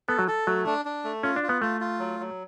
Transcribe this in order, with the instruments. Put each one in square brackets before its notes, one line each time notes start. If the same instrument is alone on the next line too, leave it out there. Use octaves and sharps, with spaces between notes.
[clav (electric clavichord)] B3 [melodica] A4
[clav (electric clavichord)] F#3
[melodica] A4
[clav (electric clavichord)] F#3 [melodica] A3
[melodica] D4
D4
A3
[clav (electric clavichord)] C#4 [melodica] F4
[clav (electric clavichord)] D4
[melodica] F4
[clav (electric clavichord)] B3
[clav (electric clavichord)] A3 [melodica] F4
[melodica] F4
F#3
F#3